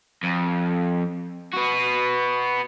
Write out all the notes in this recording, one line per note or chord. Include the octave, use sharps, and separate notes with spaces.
F2
B3 F#4